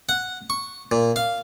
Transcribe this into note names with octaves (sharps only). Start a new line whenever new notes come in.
F#5
C#6
A#2
F5